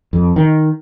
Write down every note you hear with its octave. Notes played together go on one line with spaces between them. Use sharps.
F2
D#3